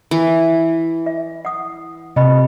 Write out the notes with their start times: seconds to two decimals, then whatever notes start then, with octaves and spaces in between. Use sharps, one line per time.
0.11 E3
1.06 E5
1.45 F#5 D#6
2.16 C3 D#5 G5 B5